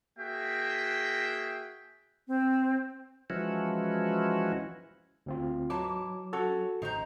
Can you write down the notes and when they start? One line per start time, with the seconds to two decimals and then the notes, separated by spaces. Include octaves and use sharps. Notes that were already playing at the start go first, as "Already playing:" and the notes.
0.18 A#3 F#4 G#4 E5 G5
2.28 C4
3.30 E3 F3 G#3 C#4 E4 F#4
5.26 D2 C4 F4
5.70 G#2 E3 F#3 A5 D6
6.33 C#4 F#4 A4
6.82 A1 D#3 C5 D#5 A#5